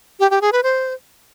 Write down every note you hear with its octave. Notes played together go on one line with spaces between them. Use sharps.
G4
G4
G#4
B4
C5